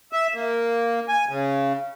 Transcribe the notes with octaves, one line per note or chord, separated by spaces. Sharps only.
E5
A#3
G#5
C#3